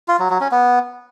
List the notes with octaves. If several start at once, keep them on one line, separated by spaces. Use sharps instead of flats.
F4
F#3
F#3
C#4
B3